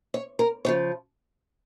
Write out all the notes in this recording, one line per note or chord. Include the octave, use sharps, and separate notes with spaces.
C#5
A#4
C#3 F3 C#5